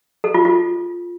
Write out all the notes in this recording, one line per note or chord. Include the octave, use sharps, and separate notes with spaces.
A4
F4
F4